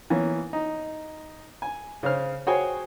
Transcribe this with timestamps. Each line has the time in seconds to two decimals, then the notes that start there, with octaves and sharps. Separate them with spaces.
0.10 E3 A#3 B3 C#4
0.53 D#4
1.62 G#5
2.03 C#3 C#4 C5 F6
2.47 F#4 G#4 C5 C#5 G5 G#5